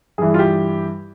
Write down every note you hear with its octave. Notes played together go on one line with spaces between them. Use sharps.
G2 E3 G#4
F4
G4